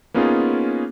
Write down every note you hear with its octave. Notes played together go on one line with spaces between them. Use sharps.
A#3 B3 C#4 D#4 F4 G#4